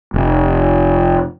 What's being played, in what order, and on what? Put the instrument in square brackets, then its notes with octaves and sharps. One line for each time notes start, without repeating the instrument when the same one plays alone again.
[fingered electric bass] F1